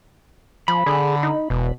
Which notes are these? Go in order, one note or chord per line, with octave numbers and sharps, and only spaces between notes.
F3 B5
D3 G#4
D#4
E1 B2